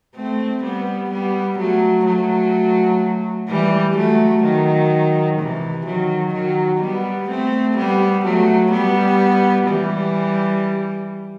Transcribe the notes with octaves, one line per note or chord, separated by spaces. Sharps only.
A3 C4
G3 B3
G3 B3
F#3 A3
F#3 A3
E3 G3
F#3 A3
D#3 F#3
C3 E3
D#3 F#3
D#3 F#3
G3 B3
A3 C4
G3 B3
F#3 A3
G3 B3
E3 G3